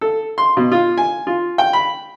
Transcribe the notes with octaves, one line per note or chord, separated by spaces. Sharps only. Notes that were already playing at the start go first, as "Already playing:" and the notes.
A4
C6
B2
F4
G#5
F4
G5
B5